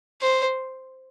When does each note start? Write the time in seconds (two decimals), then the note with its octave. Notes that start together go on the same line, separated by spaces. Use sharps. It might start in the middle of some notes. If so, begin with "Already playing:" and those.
0.21 C5